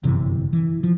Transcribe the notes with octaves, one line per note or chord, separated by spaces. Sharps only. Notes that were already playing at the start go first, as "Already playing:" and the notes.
G1 F#2 C3 E3
E3
F3